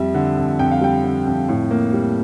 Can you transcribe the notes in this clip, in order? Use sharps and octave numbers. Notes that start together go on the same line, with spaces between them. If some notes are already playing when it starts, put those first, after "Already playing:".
Already playing: F2 G3 E5
D3
F2
F2 G5
F5
G3 G5
D3
F2
A2
A#3
G3